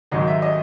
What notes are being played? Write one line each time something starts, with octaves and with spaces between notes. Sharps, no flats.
G#1 G#2 D#3 F#3 D#5
E5
D#5